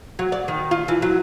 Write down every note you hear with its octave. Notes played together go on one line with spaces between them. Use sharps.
F#3
D5
D#3
F4
E3
F#3